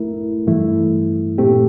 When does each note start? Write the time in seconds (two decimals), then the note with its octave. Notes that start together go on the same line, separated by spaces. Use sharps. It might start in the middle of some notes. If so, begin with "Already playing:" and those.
Already playing: A3 E4 A#4
0.47 G2 E3 A3 E4
1.38 A#2 A3 C4 G4